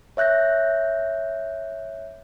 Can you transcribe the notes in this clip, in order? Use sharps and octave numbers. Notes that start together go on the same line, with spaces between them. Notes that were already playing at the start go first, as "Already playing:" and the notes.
C#5 E5 F#6 G6 A#6